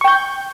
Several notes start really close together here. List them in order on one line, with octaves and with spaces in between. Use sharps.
C#6 G5 G6